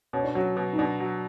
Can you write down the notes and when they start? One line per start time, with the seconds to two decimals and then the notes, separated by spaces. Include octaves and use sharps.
0.13 B2 C#4
0.24 D4
0.35 F#3 C#4
0.57 B2
0.73 D#4
0.78 B2 D4
1.00 F#3